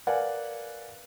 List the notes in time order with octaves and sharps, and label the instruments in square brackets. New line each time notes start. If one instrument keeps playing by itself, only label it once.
[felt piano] A#4 B4 D5 F5 F#5 G#5